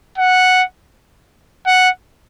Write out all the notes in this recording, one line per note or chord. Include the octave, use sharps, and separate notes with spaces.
F#5
F#5